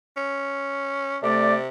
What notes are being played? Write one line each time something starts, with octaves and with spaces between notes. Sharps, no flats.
C#4
C3 A3 D5